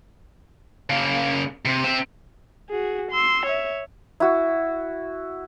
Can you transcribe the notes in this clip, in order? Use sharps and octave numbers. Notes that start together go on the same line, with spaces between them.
C#3 A#3
C3
C4 E5
F#4 G#4
C6 E6
C#5 E5
E4 F#4